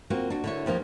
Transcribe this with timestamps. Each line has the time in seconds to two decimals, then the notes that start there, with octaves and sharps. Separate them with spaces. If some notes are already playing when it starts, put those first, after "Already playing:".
0.10 A#3 C4 F4 F#4
0.30 D4 F#4
0.44 D3 E4 C#5
0.66 D#2 F3 A#3 F5